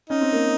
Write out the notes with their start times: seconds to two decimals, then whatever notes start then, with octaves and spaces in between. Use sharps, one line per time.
0.09 C#4 D#4
0.21 C4
0.32 A#3